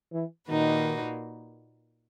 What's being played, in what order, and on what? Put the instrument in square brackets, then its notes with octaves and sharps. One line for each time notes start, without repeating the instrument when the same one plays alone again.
[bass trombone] E3
[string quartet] A#2 A#3 D#4 F#4 B4 [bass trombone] D#3